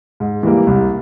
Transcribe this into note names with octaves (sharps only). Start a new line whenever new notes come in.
G#2
E3 G3 A#3
C2